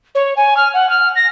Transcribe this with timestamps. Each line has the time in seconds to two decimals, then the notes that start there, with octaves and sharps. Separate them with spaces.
0.15 C#5
0.37 G#5
0.57 F6
0.74 F#5
0.90 F6
1.16 A#6